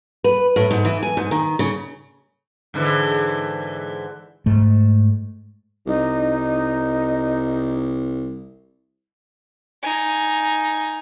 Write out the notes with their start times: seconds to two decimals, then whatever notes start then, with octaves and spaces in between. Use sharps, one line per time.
0.24 B4
0.56 A2
0.71 G#2
0.85 E3
1.03 G#5
1.17 G#2
1.31 D#3
1.59 C#3
2.74 G#2 D3 E3
4.46 G#2 A3
5.86 C2 D#4
9.83 D#4 G#5